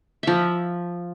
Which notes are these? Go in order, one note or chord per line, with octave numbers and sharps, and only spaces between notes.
F3 E5